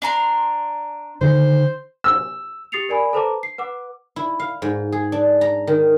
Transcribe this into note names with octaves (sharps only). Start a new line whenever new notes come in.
D4 A#5 C6
D3 D#3 C5
E6
G4 D#6 A6 C7 C#7 F7
A#4 D5 G#5 B5
A4 B4 C5 A5 A#5 D6
C7
B4 F#5 D6
E4
F5
G#2
G#4
D4
A#5
D#3